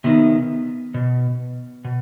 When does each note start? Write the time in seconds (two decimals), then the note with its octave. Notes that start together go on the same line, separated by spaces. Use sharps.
0.04 C3 D#3 B3
0.94 B2
1.85 B2